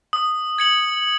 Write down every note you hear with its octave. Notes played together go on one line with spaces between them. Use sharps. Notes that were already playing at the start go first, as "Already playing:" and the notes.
D#6
G#6 C#7 F#7